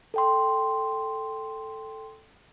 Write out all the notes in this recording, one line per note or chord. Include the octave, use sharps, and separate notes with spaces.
A4 G5 C6